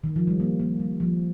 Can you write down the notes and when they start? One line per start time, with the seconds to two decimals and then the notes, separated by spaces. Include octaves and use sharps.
0.04 D#3
0.16 F3
0.27 G3
0.40 A#3
0.60 A#3
0.80 G3
1.00 F3